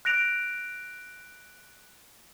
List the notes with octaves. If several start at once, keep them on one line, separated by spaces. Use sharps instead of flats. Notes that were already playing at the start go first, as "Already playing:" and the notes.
F#6 A#6 D7 F7